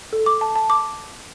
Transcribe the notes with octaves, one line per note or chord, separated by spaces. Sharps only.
A4
D6
A5
A5
D6